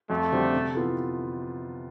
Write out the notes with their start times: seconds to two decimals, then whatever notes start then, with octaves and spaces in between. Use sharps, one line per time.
0.10 F2 A3
0.32 D3 G3 C4 G4
0.53 C3
0.75 E3 B3 F4 A4